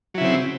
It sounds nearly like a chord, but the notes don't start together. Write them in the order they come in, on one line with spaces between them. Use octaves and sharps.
F#3 E4 C#3 C4